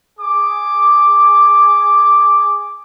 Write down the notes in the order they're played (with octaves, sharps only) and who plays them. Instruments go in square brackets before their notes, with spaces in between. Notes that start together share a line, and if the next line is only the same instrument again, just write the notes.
[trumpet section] G#4 D6